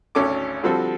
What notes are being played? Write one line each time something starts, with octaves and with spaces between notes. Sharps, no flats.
G#1 D2 C#4 A4 D6
D3 F3 G3 C4 F#4 A4